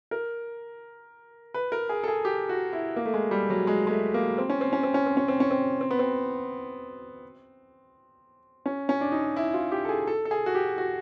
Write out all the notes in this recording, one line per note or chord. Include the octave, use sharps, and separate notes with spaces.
A#4
B4
A#4
G#4
A4
G#4
G4
F#4
E4
A#3
A3
G#3
G3
F#3
G#3
G#3
A3
A#3
C4
C#4
C4
C#4
C4
C#4
C4
C#4
C4
C#4
C4
C4
B3
C4
C#4
C#4
D4
D#4
E4
F4
G4
A4
G#4
A4
A4
G#4
F#4
G4
F#4